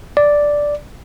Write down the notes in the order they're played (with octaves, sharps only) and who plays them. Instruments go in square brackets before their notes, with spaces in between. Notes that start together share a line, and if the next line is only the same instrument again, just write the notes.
[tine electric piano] D5